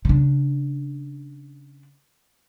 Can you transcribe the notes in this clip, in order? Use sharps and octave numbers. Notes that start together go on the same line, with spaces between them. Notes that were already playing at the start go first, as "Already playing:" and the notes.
C#3 D4